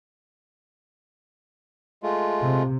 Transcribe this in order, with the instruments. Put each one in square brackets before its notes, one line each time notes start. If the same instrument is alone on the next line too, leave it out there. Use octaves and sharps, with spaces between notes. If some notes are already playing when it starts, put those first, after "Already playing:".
[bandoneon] G#3 A3 F4
[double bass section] C3